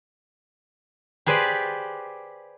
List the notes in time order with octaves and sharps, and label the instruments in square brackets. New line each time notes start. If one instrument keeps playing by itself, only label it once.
[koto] G4 G#4 B4 C5 D5